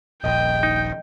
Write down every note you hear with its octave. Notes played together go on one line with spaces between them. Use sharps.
D#1 A#1 D#5 G5
D#4